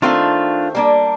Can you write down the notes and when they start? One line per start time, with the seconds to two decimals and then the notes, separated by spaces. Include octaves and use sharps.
0.02 D#3 A3 C4 D4 F4
0.75 G3 A#3 D4